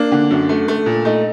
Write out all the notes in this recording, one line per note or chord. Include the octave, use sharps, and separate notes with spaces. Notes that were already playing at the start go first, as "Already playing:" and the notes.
Already playing: A#3 D4
D3
F#2
A3
A3
A#2
A3 D#4